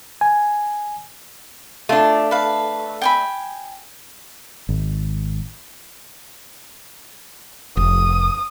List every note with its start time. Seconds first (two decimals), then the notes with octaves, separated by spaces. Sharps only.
0.21 G#5
1.89 A3 D4 F4
2.31 B4 F5
3.02 G5 G#5 B5
4.69 G#1
7.77 F1 D#6